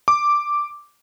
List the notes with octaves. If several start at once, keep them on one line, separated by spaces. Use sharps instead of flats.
D6